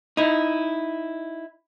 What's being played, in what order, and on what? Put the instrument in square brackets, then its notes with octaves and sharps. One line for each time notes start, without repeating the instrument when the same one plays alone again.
[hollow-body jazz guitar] D#4 E4